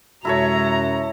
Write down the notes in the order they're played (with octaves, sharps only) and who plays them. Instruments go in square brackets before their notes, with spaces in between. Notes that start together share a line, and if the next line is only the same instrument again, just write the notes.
[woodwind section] F#2 C3 F#4 [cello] G#3 [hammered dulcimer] E4 A4 C#5 [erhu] A#5